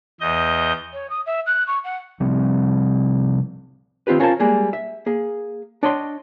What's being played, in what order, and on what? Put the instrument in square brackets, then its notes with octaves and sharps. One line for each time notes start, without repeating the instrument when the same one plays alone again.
[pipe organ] E2 D#5 G6
[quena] C#5
D#6
E5
F#6
C#6
F#5
[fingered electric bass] C3 F3 G3 C4
[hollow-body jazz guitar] D#3 C4 F4 G4 B4
C#4 F4 A#4 C5 C#5 A5
G3 G#3 A#3 G#4
E5
A#3 G#4
D4 C#5 D#5 G5 C6